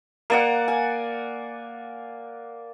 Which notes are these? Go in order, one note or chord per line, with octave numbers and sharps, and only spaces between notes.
A#3 D5 F#5
G#5